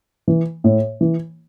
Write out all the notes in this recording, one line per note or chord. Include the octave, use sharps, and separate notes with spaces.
E3
A2
E3